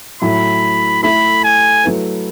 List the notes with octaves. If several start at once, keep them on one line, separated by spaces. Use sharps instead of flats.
A2 F#3 A3 E4 B5
A3 E4 A4 B5
G#5
F#3 A3 E4 B4